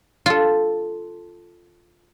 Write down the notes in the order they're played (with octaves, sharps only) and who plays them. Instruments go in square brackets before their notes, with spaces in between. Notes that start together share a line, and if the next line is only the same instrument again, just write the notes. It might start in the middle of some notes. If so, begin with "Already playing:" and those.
[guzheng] F4 A4